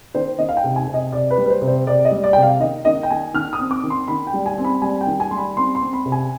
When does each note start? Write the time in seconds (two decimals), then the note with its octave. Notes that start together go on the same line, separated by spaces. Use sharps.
0.15 D#3 C5
0.38 D#3 D#5
0.49 F5
0.57 G5
0.64 C3
0.76 G#5
0.87 C3
0.94 D#5
1.12 C3 D5
1.31 B4
1.38 G3
1.46 B4
1.50 C5
1.62 C3
1.67 C5
1.87 C3 D5
2.05 D#5
2.11 G3
2.23 D5
2.33 G5
2.36 C3
2.42 F5
2.60 D#3 D#5
2.85 D#3 D#5
3.03 G5
3.10 D#3 G#5
3.34 D#3 F6
3.53 D#6
3.59 C4
3.71 D6
3.83 D#3
3.90 C6
4.08 D#3 B5
4.27 G5
4.33 G3
4.46 G#5
4.58 C4
4.64 B5
4.82 G3 G#5
5.01 G5
5.07 D#3
5.20 G#5
5.31 G3 C6
5.37 B5
5.57 C4 C6
5.75 C6
5.82 C4
5.93 B5
6.05 C3
6.12 G#5